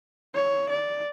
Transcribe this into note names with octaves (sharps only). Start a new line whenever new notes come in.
C#5
D5